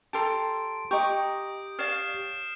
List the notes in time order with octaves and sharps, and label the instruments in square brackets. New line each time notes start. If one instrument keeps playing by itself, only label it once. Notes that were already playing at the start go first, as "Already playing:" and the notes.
[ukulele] G4 A4 A#5 [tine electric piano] A5 C6 [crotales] D7
[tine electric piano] G4 [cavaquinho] D#5 C#6 [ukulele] G5 A#5 [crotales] D#6 G6
[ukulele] C#5 D5 F5 [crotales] F6 C7 E7